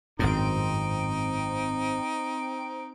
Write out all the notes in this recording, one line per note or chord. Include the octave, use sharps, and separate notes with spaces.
G#1 F#2 A2 C4 D#4 D7